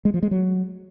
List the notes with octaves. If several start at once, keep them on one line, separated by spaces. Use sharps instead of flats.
G#3
F3
G#3
F#3